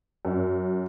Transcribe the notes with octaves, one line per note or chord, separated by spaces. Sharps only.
F#2